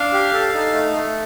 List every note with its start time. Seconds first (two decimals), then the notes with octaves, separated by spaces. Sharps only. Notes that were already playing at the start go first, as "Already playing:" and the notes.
Already playing: D4 F5
0.13 G4
0.33 A4
0.54 D#4
0.73 A3
0.93 A3